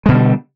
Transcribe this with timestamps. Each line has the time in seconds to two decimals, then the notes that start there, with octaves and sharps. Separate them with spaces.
0.06 G#3
0.09 B2
0.11 D3
0.14 G3